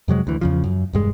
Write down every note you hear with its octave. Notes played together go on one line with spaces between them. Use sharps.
F2 C3 F#3 G#3
D2 E3
E2 C#3 F3
F#2
E1 G2 G#3